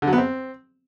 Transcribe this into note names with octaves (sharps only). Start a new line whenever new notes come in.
D3
F#3
B3
C4